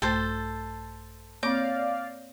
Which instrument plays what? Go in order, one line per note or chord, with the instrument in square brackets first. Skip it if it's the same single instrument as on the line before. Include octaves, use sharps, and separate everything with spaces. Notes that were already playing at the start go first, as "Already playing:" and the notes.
[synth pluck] A#1 A6 [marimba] G2 A3 [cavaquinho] A4 C5
[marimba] A#3 C4 [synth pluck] C#5 G6 A#6 [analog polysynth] D5 F5 [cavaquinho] D6